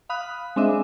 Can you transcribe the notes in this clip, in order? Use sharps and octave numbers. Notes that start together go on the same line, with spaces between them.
F5 B5 D#6 F#6
G#3 C4 D4 D#5 E5